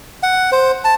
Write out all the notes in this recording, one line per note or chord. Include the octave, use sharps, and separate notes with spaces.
F#5
C5
A5